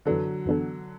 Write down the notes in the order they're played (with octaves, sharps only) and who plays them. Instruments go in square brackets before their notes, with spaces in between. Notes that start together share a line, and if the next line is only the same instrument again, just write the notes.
[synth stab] F#2 E3 B3 D4 A4 [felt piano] D3 F#3
[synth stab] F#2 E3 B3 D4 A4